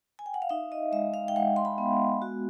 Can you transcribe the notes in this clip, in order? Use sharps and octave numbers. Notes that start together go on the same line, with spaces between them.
G#5
G5
F#5
F5
D#4 E5
D#5
G#3 E5
F5
G5
G#3 F#5
C6
B5
B3
F#4